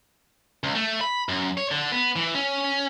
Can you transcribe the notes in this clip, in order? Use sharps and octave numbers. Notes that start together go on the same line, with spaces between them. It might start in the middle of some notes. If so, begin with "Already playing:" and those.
C#2
A3
B5
F#2
C#5
D3
B3
E3
C#4